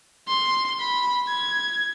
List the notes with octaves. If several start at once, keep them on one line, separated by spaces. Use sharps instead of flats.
C6
B5
G#6